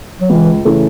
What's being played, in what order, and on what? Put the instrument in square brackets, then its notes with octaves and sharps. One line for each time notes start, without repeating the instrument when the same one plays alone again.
[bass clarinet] F#3
[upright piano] C#2 [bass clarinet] E3
[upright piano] C#3 E3 A3 C#4